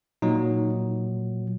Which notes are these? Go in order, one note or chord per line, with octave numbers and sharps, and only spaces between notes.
A#2 F#3 D#4